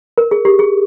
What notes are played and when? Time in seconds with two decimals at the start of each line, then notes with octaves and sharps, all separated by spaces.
0.18 A#4
0.31 G#4
0.45 G4
0.59 G#4